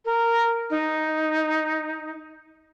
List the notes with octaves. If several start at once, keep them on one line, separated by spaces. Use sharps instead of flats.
A#4
D#4